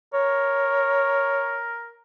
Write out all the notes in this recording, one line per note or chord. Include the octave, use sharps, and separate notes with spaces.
A#4 C#5